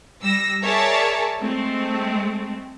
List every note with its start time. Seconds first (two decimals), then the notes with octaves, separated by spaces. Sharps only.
0.21 G3 E6 A#6
0.64 G#4 A#4 C#5 D5 E5 A5
1.41 G#3 A3 C4